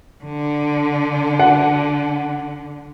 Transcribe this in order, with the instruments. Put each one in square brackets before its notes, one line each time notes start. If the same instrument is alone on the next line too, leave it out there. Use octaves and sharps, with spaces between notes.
[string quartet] D3
[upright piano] F#5